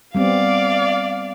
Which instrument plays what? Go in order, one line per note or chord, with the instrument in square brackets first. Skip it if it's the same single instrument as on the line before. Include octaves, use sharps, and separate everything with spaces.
[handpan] G3 B3 C4 [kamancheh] D5 F5